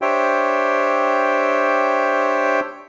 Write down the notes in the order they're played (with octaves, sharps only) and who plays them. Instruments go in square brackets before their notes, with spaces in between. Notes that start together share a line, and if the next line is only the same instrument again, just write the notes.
[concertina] D4 G4 C5 C#5 E5 G5